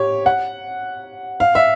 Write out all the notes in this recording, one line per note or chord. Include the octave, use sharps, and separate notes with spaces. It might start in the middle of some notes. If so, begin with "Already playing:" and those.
Already playing: G4 C#5
F#5
F5
E5